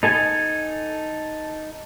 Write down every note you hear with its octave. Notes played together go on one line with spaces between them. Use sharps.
D#4 A4 G#5